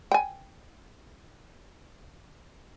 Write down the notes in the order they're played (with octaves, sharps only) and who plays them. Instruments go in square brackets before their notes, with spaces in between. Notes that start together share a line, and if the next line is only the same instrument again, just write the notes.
[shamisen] G5 G#5